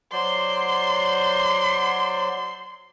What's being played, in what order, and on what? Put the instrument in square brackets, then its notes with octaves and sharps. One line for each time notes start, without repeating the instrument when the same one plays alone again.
[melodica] F#3 C5 D5 [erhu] C6